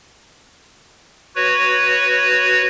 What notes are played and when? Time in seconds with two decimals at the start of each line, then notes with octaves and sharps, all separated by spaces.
1.36 F#4 B4 C#5